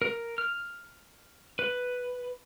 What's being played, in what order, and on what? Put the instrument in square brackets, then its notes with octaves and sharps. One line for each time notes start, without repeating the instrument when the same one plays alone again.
[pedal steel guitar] A#4
F6
B4